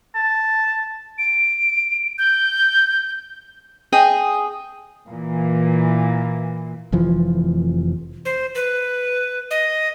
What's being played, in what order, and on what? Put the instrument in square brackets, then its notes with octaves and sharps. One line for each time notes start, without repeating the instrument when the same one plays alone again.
[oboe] A5
[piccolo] D7
G6
[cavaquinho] G#4 D#5 G5
[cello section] A#2 E3
[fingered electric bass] F1 F2 E3 F3
[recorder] C5
B4
D#5